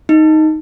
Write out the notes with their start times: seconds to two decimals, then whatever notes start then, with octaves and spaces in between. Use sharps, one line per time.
0.09 D#4